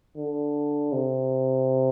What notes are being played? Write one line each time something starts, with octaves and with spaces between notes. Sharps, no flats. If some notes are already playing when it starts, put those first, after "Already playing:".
D3
C3